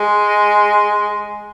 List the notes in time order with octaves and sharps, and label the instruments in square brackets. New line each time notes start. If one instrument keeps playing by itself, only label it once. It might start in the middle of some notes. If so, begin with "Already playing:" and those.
Already playing: [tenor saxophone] G#3